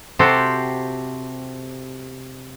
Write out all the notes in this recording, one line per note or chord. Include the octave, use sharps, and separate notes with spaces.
C3 F#4 G4 A4 C5